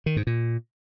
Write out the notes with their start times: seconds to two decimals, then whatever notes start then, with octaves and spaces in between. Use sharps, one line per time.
0.06 D#3
0.16 G#2
0.27 A#2